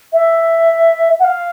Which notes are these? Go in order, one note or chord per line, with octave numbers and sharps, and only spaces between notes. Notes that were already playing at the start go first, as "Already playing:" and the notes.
E5
F#5
F5